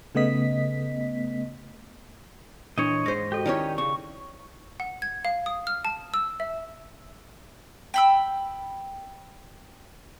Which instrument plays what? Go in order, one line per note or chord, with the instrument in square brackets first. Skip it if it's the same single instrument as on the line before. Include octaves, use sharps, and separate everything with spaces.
[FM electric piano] C#3 A3 B3 D#5 B6
[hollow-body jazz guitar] A#2 E3 [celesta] D4 G#6 [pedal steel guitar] C#5 D#5
[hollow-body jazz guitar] G#2 C5 [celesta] A#6
[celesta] F#4 A4 [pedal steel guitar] G4 D#5
[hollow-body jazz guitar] D#3 C#4 C#5 [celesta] D#4 E4 D5
[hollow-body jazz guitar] C#3 [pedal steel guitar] C#6
[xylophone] F#5
G#6
F5
D#6
F6
A5
E6
E5
[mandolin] G5 B5 E6